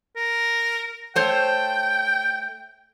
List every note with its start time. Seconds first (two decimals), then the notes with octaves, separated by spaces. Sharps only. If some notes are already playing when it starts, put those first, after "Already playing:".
0.16 A#4
1.16 A3 C5 C#5 G5